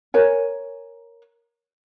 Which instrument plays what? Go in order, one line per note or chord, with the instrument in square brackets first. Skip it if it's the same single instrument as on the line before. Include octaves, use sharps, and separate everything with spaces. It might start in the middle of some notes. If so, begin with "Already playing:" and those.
[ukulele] A#4 C#5 G#5